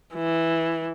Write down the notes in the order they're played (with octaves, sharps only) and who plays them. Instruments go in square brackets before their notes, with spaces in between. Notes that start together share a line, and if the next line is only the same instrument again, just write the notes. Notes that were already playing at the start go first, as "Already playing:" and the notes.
[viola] E3